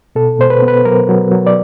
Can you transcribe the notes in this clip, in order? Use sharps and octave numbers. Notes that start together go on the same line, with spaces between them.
B2 A4
B2 C5
B4
B3
B4
F#3 A#4
F#3
F#3
D5